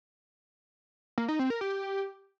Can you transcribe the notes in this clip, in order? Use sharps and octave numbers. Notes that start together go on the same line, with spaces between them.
A#3
D#4
C4
A#4
G4